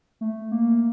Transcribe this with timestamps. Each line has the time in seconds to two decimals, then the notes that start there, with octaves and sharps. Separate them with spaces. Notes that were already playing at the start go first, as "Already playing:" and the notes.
0.21 A3
0.52 A#3